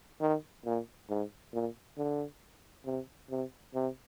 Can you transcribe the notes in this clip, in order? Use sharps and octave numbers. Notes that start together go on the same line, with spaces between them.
D#3
A#2
G#2
A#2
D3
C3
C3
C3